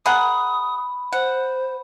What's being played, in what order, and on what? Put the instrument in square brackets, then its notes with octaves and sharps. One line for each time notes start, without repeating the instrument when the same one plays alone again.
[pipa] G#4 A#4 F#5 [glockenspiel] B5 [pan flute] D#6
[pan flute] C5 [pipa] F#5